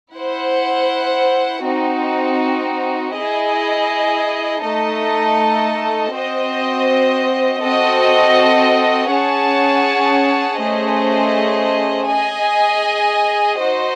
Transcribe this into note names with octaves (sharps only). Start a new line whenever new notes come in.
E4 C5 F#5
C4 D#4 F#4
E4 G#4 D#5
A3 D#4 A4 D#5
C4 F#4 C5 D#5
C4 F#4 A4 D#5
C#4 G#4 C#5 F#5 A5
A3 C#4 G#4 C5 D#5
G#4 D#5 G#5
D#4 F#4 C5 D#5